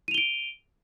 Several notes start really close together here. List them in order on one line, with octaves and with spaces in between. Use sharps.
D#7 F7 G7 D7